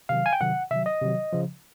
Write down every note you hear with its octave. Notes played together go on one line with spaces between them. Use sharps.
C3 D#3 F#3 F5
G#5
G5
C3 D#3 F#3 F#5
C3 D#3 F#3 E5
D#5
C3 D#3 F#3
C#3 F3